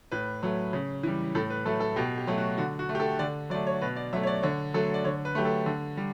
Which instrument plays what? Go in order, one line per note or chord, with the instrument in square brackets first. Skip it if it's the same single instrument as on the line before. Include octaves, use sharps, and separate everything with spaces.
[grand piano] A2 B4
F#3 A3
C#3
E3 G3
A2 A4
B4
F#3 A3 A4
A4
B2 G4
G4
F#3 A3
F#4
D3 F#4
F#4
A3
G4
A4
D3 D5
F#3 D5
A3
C#5
B2 B4
D5
F#3 E5
A3
C#5
D5
D3 C#5
F#3 A3 A4
D5
D3 C#5
B4
F#3 A3 G4
A4
D3
G3